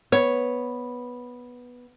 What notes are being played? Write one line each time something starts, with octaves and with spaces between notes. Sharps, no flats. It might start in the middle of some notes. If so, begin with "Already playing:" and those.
B3 C#5